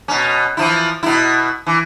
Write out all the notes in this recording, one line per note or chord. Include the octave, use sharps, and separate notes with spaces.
B2 C#4
E3 F3 E4
B2 E4
E3